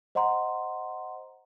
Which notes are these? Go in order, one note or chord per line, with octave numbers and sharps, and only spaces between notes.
C5 D#5 F#5 A#5 C6